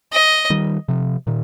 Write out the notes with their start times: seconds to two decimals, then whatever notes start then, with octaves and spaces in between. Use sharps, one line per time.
0.12 D#5
0.50 D#3 G3
0.88 C3 F3
1.27 A#2 D#3